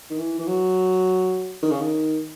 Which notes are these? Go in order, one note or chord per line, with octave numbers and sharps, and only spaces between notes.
D#3
E3
E3
F#3
D#3
C#3
D#3